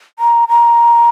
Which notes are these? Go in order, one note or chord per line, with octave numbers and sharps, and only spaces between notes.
A#5
A#5